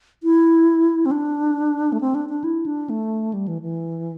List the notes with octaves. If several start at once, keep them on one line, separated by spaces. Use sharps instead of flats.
E4
C4
D4
A3
C4
D4
D4
E4
D4
A3
G3
E3
E3